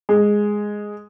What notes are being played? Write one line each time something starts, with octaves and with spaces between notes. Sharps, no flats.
G#3